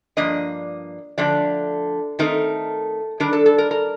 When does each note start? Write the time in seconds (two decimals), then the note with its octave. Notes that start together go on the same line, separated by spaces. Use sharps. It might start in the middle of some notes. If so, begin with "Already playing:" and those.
0.17 G2 F3 A#3 D4 D#5
1.18 D3 F3 A3 D4 D5
2.19 D#3 A3 C4 D#4 A#4
3.20 D#3 G3 D4 A#4
3.33 A4
3.46 A4
3.58 A#4
3.71 A#4